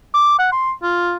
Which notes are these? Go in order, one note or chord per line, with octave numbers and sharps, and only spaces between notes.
D6
F#5
C6
F4